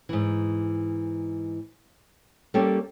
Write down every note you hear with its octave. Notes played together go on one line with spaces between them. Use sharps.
G#2 E3
G3 A#3 C#4 G4 A4 C#5